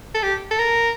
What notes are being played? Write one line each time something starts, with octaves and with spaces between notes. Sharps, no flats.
A4
G4
A4
A#4